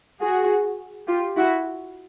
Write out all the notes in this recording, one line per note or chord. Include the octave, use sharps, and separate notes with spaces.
F#4 G#4
F4 G4
E4 F#4